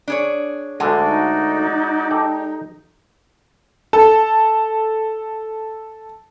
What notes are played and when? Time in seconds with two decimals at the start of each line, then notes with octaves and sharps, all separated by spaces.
0.08 D4 G#4 C#5
0.80 D2 D3 G#3 F#4 D5
1.05 D#4
2.11 G4 A4 D5
3.93 A4 A5